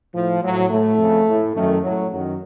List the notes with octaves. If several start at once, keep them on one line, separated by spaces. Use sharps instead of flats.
A2 F3
A2 F#3
A2 A3
F2 C#3
A2
F#2 D#3 A3
A2 F#3
F#2 D#3 F#3